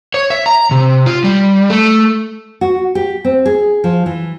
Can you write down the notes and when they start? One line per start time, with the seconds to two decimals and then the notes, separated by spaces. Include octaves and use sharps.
0.14 C#5
0.30 E5
0.46 A#5
0.71 C3
1.06 F4
1.24 G3
1.70 A3
2.61 F#4
2.95 G4
3.25 C4
3.46 G#4
3.84 F3
4.06 E3